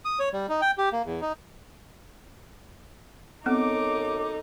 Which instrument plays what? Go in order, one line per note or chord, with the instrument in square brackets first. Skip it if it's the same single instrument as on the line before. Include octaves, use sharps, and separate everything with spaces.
[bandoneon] D#6
C#5
G3
D#4
G5
G4
A#3
E2
D#4
[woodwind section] F#2 D6 [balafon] B3 C4 [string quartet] D#4 [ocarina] A4